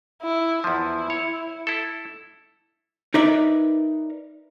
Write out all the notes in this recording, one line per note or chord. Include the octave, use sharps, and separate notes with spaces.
E4
E2 F3 E4
C#5
E4 A4
D#4 A#4 B4 D5 E5